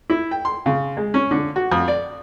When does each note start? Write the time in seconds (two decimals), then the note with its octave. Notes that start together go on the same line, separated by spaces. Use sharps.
0.10 E4
0.31 G5
0.45 C6
0.66 C#3
0.97 G#3
1.14 C#4
1.31 D3
1.56 F#4
1.72 F2
1.88 D5